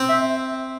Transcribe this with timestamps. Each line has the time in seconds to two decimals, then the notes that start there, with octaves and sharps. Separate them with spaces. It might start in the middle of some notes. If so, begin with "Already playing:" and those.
Already playing: C4 C5
0.09 E5